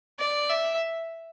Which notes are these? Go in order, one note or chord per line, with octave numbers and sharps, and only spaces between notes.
D5
E5